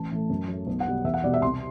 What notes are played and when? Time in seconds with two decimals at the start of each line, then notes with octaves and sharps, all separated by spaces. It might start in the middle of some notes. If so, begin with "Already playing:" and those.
Already playing: A1 A5
0.11 A2 E3 A3
0.30 F#2
0.48 F#3
0.53 A3
0.67 B1
0.80 F#5
0.86 B2 G3
1.04 E2 E5
1.14 F#5
1.24 B2 G3 D5
1.34 E5
1.42 C2 C6